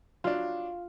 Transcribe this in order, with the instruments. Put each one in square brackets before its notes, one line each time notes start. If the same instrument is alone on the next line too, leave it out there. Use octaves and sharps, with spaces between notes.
[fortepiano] F#3 D4 [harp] F4 [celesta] F5